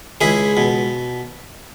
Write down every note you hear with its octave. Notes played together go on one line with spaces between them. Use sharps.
C#2 E4 G#4
B2